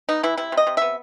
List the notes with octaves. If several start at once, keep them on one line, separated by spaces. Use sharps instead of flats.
B3 D#4
E3 E4
C3 E4
C3
D#5
C3
B3 E5